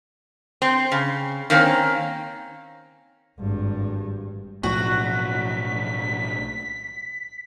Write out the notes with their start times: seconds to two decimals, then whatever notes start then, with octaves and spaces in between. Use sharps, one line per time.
0.62 C4
0.92 C#3
1.50 D#3 A#3 C4 C#4
3.38 G#1 G2
4.63 B1 A2 F3 F#4 B6